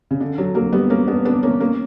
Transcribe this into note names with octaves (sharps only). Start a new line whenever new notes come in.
C#3
D3
D3 F#3
F#3 A#3
G3 B3
A#3 C#4
B3 D4
B3 D4
A#3 C#4
A#3 C#4